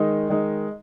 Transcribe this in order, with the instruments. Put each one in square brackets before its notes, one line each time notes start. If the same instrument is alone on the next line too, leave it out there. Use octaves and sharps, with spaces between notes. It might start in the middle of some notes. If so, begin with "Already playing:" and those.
Already playing: [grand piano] D#3 G#3 D#4
D#3 G#3 D#4